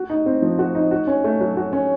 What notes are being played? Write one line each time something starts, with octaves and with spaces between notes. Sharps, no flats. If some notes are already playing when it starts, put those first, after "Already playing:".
Already playing: F#4
D#4
C4
F3
F#4
D#4
F#4
C#4
A3
F#3
F#4
C#4